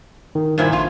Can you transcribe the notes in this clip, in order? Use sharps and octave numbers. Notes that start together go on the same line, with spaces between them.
D#3
G2 A#2 D#3 E4 C5 G#6
A1 F2 F4